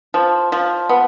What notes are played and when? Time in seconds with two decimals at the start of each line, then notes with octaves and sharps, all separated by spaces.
0.14 F3
0.52 F3
0.89 B3